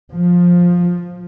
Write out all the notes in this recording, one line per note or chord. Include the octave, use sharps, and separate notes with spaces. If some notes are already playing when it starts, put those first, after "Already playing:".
F3